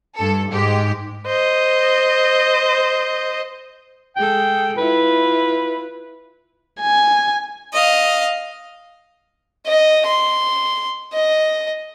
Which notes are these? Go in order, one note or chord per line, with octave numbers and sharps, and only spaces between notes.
G2 A4
G#2 G#3 G4
C5 D#5
G#3 G#4 A4 G5
E4 F4 B4
G#5
D#5 F5
D#5
C6
D#5